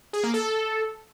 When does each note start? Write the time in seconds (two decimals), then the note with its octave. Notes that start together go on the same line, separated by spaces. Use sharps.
0.13 G#4
0.24 A#3
0.34 A4